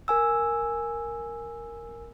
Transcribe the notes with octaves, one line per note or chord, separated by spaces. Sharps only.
A#4 G#5 E6